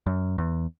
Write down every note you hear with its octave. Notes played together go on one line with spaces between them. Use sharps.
F#2
E2